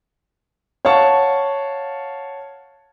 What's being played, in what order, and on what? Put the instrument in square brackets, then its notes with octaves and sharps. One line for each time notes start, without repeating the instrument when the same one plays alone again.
[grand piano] C#5 F5 F#5 A5 C#6